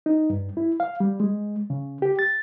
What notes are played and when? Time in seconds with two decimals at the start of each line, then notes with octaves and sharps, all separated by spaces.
0.06 D#4
0.30 G2
0.57 E4
0.80 F5
1.00 G3
1.20 G#3
1.70 C#3
2.02 G4
2.19 A6